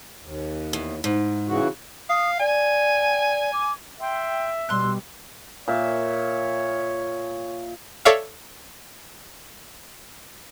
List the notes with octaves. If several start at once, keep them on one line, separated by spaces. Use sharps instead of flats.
D#2
E2
G#2
C#3 E3 F#4
F5 D#6
D5 G#5
D6
E5 G5 C6
B2 G3 C6 E6 F#6
A#2 C#5 E5
A4 C#5 D5 E5 F5